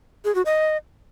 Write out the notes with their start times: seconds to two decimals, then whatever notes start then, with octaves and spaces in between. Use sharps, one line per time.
0.25 G#4
0.35 F#4
0.46 D#5